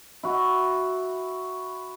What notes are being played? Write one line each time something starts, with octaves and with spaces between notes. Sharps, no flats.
E4 F#4